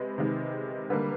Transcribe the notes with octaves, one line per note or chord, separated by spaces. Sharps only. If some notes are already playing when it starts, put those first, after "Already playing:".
Already playing: C3 G#3 B4
C3 D#3 G#3
D3 G3 A#3 B4